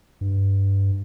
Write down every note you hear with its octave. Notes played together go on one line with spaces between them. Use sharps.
G2